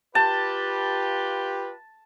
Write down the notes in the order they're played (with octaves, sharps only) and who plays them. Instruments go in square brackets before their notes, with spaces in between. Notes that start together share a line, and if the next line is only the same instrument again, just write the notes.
[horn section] F4 G4 B4 [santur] A5